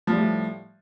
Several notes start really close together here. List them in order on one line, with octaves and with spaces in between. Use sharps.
F3 G3 A2